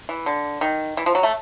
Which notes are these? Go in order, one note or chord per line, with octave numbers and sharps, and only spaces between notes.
E3
D3
D#3
E3
F3
F#3
A3